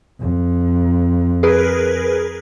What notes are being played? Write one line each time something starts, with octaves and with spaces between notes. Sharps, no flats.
F2
G#4 A#4 B4